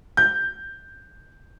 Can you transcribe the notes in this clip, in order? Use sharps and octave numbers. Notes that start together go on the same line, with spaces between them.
G6